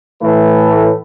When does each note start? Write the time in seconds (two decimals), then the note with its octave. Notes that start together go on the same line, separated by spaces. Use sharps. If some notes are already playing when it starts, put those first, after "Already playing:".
0.22 A2 E3 A3 B4